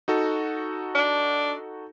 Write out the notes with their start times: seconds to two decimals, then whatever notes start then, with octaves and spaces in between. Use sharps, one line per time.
0.08 D#4 F#4 A4
0.95 D4